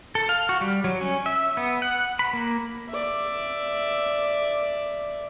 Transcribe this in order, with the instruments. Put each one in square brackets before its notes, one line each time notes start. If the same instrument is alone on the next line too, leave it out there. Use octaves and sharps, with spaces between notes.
[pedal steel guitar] A4
F5
F#4
G3
F#3
C#4
E5
B3
F#5
B5
A#3
[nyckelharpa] D5 E5